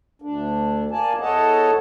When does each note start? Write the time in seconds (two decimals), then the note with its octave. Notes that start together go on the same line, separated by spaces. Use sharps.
0.22 D2 D4
0.91 A#3 D5 G#5 A5
1.20 E2 A4 C#5 D#5 F#5 A5